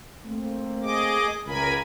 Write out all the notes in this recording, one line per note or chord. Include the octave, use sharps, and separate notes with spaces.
A3 A#3 C4
G#4 D#5 D6
C#2 A#4 G#5 B5